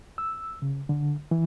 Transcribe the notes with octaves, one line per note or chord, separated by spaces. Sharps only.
E6
C#3
D3
E3